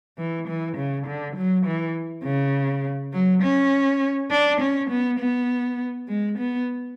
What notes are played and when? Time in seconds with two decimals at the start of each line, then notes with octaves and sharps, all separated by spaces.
0.18 E3
0.48 E3
0.77 C#3
1.07 D3
1.36 F#3
1.66 E3
2.24 C#3
3.13 F#3
3.43 C#4
4.31 D4
4.61 C#4
4.90 B3
5.19 B3
6.08 G#3
6.38 B3